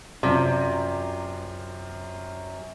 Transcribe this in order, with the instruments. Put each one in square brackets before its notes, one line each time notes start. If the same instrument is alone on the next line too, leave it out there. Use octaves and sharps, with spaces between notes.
[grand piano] F#2 F4 D5 [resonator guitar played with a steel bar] C3